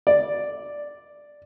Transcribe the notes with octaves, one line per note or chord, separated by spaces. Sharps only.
D5